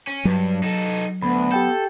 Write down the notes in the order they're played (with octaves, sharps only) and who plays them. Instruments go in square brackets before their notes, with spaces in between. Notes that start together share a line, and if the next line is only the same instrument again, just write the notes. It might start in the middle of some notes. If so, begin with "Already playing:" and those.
[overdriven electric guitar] C#4
[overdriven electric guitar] G2 [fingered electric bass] F#3
[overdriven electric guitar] D#4 A4
[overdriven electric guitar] D2 [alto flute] B3 [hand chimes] B5
[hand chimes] G4 G5 G6 [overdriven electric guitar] A4